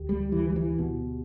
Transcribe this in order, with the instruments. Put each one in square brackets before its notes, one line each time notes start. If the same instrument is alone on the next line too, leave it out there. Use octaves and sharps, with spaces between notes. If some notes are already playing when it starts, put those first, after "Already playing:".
Already playing: [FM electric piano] D2 D3 G4
[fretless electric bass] G3
E3
G3
E3
B2